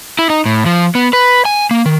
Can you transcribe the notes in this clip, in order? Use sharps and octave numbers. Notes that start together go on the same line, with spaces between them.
E4
D#4
A2
F3
B3
B4
G#5
A#3
D#3